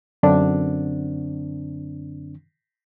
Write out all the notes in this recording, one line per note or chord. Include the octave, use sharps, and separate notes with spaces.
F#2 D3 C4 D4